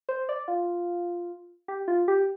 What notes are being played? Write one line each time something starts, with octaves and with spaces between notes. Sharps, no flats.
C5
D5
F4
G4
F4
G4